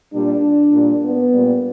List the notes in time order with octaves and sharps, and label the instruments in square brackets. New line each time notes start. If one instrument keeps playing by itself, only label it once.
[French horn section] A#2 G3 D4
A#2 G3
B3
A#2 G3